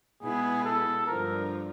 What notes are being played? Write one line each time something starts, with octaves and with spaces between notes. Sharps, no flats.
B2 G#3 B3 E4 G#4
A4
G2 D3 F3 A#4